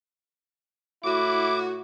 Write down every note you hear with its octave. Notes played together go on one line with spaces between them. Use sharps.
A2 E4 F#4 D6